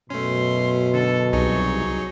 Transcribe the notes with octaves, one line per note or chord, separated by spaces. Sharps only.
F#2 B2 A3 C#4 C6
D3 A4
C2 F#3 D#4 G#4 C#5